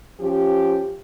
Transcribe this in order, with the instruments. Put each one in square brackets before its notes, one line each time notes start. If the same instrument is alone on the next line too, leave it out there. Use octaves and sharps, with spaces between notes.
[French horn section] F3 C#4 G4